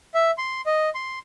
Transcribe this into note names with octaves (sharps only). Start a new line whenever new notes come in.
E5
C6
D#5
C6